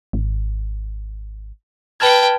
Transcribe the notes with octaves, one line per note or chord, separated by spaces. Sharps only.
G#1
B4 G5 A5 F6 G#6